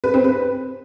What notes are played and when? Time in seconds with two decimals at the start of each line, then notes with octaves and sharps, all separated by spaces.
0.04 B4
0.14 C4
0.24 B4